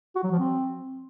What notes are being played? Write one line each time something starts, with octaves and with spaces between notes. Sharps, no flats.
F#4
F#3
F3
C4